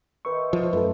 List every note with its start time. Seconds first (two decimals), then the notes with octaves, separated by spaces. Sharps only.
0.25 D#3 B4 C5 E5 C#6
0.53 F3
0.73 F#2 A3 A4 B4